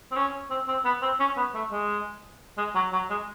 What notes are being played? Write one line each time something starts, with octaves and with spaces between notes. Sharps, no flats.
C4
C#4
C4
C4
B3
C4
C#4
B3
A3
G#3
G#3
F#3
F#3
G#3